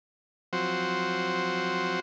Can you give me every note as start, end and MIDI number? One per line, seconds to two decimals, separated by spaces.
0.53 2.00 53
0.53 2.00 54
0.53 2.00 60
0.53 2.00 66
0.53 2.00 72